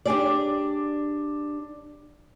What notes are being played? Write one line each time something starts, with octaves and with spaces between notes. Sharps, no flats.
D4 G4 G#4 D5